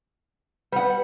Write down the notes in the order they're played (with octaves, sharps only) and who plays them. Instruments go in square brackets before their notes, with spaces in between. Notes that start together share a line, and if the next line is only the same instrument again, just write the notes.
[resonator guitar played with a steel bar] G3 F#5 [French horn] B4